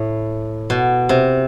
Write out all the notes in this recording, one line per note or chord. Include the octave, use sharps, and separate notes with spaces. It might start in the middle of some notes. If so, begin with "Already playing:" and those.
Already playing: A2
B2
C3